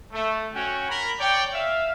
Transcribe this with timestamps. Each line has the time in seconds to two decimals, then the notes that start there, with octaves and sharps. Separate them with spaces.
0.12 A3
0.53 C#4 F#4 C#5 G5
0.89 A#4 B5
1.20 C#5 D5 G5
1.53 E5 F5